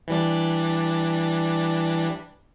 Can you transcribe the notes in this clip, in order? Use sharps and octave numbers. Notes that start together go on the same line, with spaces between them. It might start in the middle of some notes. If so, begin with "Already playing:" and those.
E3 G3 D4